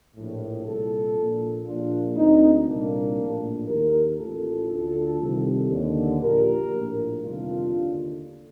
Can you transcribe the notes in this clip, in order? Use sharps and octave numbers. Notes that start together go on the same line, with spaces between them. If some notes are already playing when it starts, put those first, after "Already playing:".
A#1 A2
C2 A#2 F4 A4
A#1 A#2
A#1 A#2 D4 F4
D2 D3 C4 D#4
C2 A#2 A#3 D4
A#1 A2
D#2 D#3 G4 A#4
A1 A2 F4 A4
D2 D3
C2 C3 D#3
D#2 D3
A#1 A#2 G4 A#4
A#1 A2
G1 F2 C3 D#3 D4 F4
D#2 D3